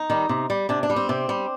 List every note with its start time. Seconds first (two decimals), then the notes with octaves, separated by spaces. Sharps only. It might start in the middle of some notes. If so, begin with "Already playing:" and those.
Already playing: D#4
0.10 D#3 G3
0.29 C3
0.50 G3
0.69 C3 D4
0.83 D4
0.90 G3
0.96 C4
1.09 C3
1.29 G3